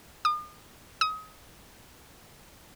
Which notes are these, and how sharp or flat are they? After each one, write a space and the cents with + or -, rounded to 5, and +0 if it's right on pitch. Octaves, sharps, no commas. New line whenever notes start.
D#6 -40
D#6 +30